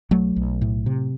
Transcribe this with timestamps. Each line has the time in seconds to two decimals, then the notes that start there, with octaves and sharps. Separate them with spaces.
0.11 B1 F#3 A3
0.36 B1
0.61 A2
0.86 C3